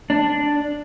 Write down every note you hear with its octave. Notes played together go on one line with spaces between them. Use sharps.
D4